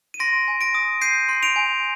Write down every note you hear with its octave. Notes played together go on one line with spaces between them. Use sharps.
D#7
C6 A#6 D7
G#5
A#6 D7
D#6
G6 C7 D#7
C6
D7 F7
G#5